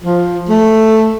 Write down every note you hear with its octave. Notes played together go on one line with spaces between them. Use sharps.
F3
A3